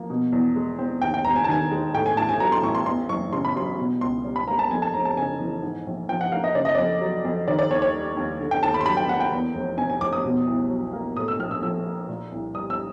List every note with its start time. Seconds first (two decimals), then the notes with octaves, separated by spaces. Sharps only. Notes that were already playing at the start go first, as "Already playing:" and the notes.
Already playing: F3 A#3
0.10 B2
0.33 E2
0.56 G#3
0.79 C4
1.02 D#2 G5
1.14 G5
1.25 E1 A#5
1.36 G#5
1.44 A5
1.48 D#3 G#5
1.71 G#3
1.94 A2 G5
2.06 G#5
2.17 A1 A5
2.29 G#5
2.40 F#3 A#5
2.52 C6
2.63 A1 C#6
2.75 C6
2.86 E2 C6
3.09 F#1 C#6
3.33 C#3 C6
3.45 B5
3.56 F#3 C6
3.78 B2
4.01 C#2 C6
4.24 G3
4.36 B5
4.48 A#3 A#5
4.59 A5
4.70 F2 G#5
4.82 A5
4.94 F1 A#5
5.05 A5
5.17 C#3 G#5
5.40 E3
5.63 G#2
5.86 A#1
6.09 F3 G5
6.21 F#5
6.32 A#3 F5
6.44 D#5
6.55 C#3 D5
6.65 D#5
6.75 F2 D5
7.01 F#3
7.25 F2
7.48 D#3 D5
7.59 D5
7.71 D#2 C#5
7.82 C#5
7.94 G3
8.17 D#2
8.40 D3
8.51 G5
8.63 D#2 A5
8.74 B5
8.81 C6
8.86 F#3 B5
8.97 G5
9.08 A#3 F#5
9.20 G5
9.32 E2
9.55 F1
9.78 C3 G#5
9.90 G#5
10.01 F1 D6
10.13 D#6
10.24 B2
10.47 C2
10.70 F#3
10.93 A#3
11.16 A2 D#6
11.28 E6
11.39 A#1 F6
11.51 E6
11.62 F3 E6
11.86 A#3
12.09 A#2
12.32 C2
12.54 G3 D#6
12.70 E6